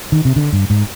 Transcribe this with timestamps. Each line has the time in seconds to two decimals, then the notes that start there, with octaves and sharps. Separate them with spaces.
0.12 D#3
0.25 C3
0.36 D3
0.53 G2
0.70 G#2